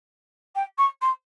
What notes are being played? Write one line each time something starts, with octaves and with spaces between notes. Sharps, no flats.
G5
C#6
C6